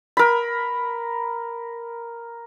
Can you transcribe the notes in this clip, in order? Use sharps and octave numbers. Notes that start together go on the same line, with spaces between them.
A#4 B5